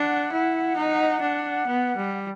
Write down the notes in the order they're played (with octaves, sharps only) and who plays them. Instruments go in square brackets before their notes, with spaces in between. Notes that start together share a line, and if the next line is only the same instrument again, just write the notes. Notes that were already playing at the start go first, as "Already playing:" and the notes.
Already playing: [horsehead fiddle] D4 [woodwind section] F#5
[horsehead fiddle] E4
D#4
D4
B3
G3